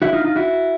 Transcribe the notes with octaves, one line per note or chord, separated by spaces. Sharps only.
E4 F#4
D#4 F4
D#4 F4
E4 F#4